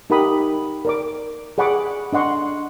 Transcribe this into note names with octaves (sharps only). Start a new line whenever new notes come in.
D#4 G4 A#4 F#5 B5 D#6
A#4 D5 D6
G#4 D5 F#5 B5 C#6 D6
D4 D#5 F#5 C6 C#6